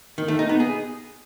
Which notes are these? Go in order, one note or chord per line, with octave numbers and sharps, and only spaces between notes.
D#3
A3
D#4
B3
G#4